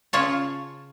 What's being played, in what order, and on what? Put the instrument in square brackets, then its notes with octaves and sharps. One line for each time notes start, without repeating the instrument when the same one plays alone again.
[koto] C#3 F4 C#5 A5